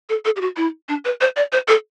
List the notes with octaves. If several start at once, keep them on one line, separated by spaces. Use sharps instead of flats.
A4
A4
G4
F#4
E4
D4
B4
C5
D5
C5
A4